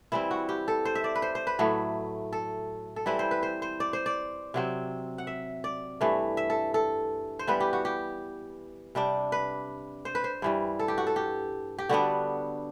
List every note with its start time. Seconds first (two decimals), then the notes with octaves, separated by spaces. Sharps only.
0.12 E3 G3 C4 E4
0.31 F#4
0.49 G4
0.68 A4
0.85 C5
0.95 E5
1.04 D5
1.15 B4
1.22 C5
1.35 C5
1.47 B4
1.59 A2 F#3 A3
2.33 A4
2.96 A4
3.06 E3 G3 C4 E4 B4
3.19 C5
3.31 B4
3.43 C5
3.62 C5
3.80 D5
3.93 C5
4.06 D5
4.54 C3 F#3 C4
5.18 F#5
5.27 E5
5.64 D5
6.01 G2 E3 A3
6.37 E5
6.50 A4
6.74 A4
7.39 C5
7.47 E3 G3 B3 B4
7.60 G4
7.73 F#4
7.85 G4
8.95 C3 G3 D4
9.32 B4
10.05 C5
10.15 B4
10.24 C5
10.42 G2 E3 G3
10.79 A4
10.88 G4
10.98 F#4
11.07 A4
11.16 G4
11.79 G4
11.89 D3 G3 B3 D4 F#4